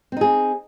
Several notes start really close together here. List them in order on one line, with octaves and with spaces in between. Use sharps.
C4 D#4 G#4